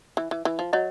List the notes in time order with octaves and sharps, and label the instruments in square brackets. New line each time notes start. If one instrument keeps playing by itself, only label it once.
[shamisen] E3
E3
E3
F3
[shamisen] F#3 [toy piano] C#5 D#5